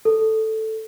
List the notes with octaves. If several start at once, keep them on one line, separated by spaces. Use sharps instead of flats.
A4